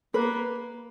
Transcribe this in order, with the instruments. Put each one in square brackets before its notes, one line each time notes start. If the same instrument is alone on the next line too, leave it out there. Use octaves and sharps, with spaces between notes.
[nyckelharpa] A#3 [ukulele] B4